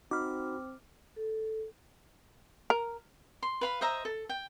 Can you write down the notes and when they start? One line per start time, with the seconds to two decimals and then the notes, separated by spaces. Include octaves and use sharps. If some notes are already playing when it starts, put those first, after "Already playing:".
0.11 C4 D#4 F#4 B5 D6 F6
1.16 A4
2.70 A#4
3.43 C6
3.61 B4 F5 B5
3.81 C5 D#5 E5 A#5
4.05 A4
4.29 G5